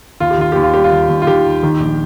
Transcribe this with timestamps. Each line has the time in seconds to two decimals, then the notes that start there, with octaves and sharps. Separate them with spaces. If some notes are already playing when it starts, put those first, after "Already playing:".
0.20 D#2 F4
0.30 G4
0.38 D#3 F4
0.52 D#2 G4
0.63 F4
0.74 G3 G4
0.84 F4
0.92 D#2
1.09 D#2
1.22 F4
1.27 D#3 G4
1.45 D#2
1.63 D#3
1.80 A#1